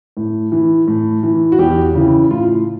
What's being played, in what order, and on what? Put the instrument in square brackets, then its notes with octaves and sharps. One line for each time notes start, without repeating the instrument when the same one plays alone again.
[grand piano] A2
E3
A2
E3
F#4
E2 G4
C#3 E3
A2 F4